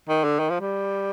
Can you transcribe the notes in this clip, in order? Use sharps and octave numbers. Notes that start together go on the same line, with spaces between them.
D#3
D3
D#3
F3
G3